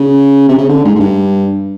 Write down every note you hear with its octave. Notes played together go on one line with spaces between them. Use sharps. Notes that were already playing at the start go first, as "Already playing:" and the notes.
Already playing: C#3
C3
C#3
D3
G#2
G#2
G2